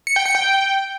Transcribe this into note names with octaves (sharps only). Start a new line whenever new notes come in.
C#7
G5
C#7
G5